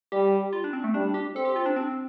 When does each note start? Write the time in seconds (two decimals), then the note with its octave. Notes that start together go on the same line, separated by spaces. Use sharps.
0.12 G3 G4
0.53 F4
0.64 D4
0.73 C4
0.84 A3
0.94 G3 D4
1.14 G4
1.35 C4 A4
1.45 G4
1.56 F4
1.66 D4
1.76 C4